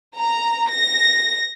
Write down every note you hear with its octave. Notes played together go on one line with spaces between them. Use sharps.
A#5
A#6